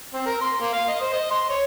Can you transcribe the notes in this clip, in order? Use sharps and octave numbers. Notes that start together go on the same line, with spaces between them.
C4
A#4
C6
A#3
F5
D#5
C5
D#5
C6
C#5